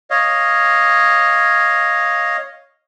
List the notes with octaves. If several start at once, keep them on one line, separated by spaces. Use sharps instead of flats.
C#5 D#5 F5